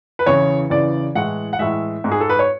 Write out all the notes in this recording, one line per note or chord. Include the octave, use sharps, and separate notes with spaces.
B4
E2 C#3 E3 C#5
E2 C#3 E3 D5
A2 E3 G#3 F#5
F#5
A2 E3 G#3 E5
G#2 G#3
G#4
A4
B4
C#5